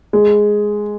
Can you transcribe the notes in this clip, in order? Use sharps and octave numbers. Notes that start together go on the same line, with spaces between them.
G#3